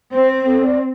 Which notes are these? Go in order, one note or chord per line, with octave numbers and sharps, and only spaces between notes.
C4 C5
A4
D5